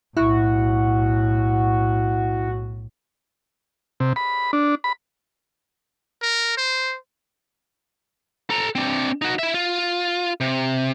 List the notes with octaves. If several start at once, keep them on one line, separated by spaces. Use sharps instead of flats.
B1 A2 E4 F#4
C3
B5
D4
B5
A#4
C5
A4 A#5
C4 D4
D#4 F#4
E4 E5
F4
C3